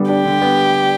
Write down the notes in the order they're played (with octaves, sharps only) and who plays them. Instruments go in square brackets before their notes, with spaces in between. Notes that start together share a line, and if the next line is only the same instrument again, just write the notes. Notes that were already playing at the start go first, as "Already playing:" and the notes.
Already playing: [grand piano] D3 G3 B3
[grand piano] D4 [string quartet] G4
[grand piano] D3
B3